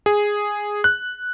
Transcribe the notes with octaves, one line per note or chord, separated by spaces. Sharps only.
G#4
F#6